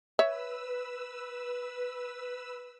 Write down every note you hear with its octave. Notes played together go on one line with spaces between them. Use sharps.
B4 C#5 E5 E6